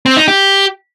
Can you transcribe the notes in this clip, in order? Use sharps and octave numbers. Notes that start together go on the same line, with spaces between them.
C4
D#4
G4